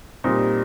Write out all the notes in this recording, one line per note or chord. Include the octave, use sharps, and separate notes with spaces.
A#2 G3 C4 D#4